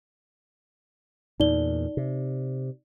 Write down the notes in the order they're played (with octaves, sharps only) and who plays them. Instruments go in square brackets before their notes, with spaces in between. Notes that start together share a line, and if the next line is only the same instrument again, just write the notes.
[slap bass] E2 A#2 [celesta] D#4 D5 G7
[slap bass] C3